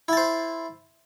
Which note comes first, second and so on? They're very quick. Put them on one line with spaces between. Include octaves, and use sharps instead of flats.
E4 A5 C5